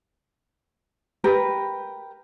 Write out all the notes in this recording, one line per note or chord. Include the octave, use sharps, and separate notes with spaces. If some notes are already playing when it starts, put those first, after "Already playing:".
G4 A#4 B4